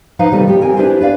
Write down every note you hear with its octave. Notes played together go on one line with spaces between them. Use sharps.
F3 D#4 B4 F5
C3 D#3 G3 A3 C4
F3 G4
C4 A#4 G#5
D4 E4 G4 B4 C5
B4 D5 F5